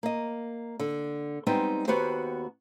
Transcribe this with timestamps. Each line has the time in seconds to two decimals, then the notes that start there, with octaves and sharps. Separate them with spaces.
0.03 A#3 D#5
0.80 D3
1.47 G3 G#3 B3 C4 D#4 G5
1.88 D#2 B3 F#4 G4 C5